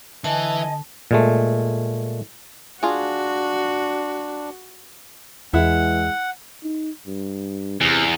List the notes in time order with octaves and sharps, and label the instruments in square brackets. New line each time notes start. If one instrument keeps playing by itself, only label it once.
[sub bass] D3 [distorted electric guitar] E3 [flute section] D#5 G#5 [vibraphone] A5
[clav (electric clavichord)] A#2 G#3 A3
[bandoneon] D4 [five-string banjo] F4 G#4 [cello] F#4
[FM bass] E2 [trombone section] E3 G#3 [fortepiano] E4 [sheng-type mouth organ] F#5
[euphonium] D#4
G2
[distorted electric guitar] E2 [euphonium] C3